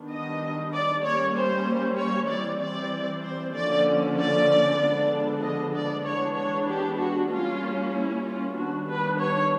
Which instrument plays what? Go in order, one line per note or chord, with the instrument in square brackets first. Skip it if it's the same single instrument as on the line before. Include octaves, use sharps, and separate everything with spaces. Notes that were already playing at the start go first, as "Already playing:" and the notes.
Already playing: [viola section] D#3 G3 B3 D4
D#5
D5
G3 A#3 C#4 C#5
C5
C#5
E3 G3 C4 D5
D5
C5
D3 F3 A#3 C#4 D5
D5
D3 F3 G#3 B3 D4
D#5
D5
E3 G#3 B3 D4 C#5
C#5
G4
F#4
G3 A#3 C#4 F4
E4
F4
D#3 G3 B3 D4 F#4
B4
C#5